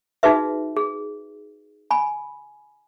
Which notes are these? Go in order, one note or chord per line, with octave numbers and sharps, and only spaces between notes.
D#4 F#4 G#4 B4 E5
G#4
G#5 B5